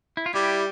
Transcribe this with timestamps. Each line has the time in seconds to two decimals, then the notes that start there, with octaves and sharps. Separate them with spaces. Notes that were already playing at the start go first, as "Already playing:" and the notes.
0.17 E4
0.26 F4
0.34 G3 E4 G4